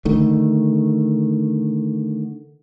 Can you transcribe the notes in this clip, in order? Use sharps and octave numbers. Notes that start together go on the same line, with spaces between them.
D3 D#3 A3